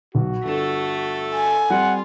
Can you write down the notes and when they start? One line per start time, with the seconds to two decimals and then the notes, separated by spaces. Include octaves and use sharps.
0.15 B1 F#4
0.44 G1 D3 A3 A4 E7
1.34 G#5
1.70 G3 C4 F4 F#5